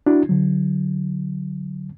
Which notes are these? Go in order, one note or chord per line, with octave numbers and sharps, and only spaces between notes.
D4 E4 F#4
D3 F#3